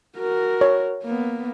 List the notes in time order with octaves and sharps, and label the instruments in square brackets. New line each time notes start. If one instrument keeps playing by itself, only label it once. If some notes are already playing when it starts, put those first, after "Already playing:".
[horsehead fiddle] F#4 A#4
[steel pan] C#5
[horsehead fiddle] A#3 B3